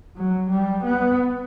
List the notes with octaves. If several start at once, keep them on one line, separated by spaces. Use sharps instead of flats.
F#3
G3
B3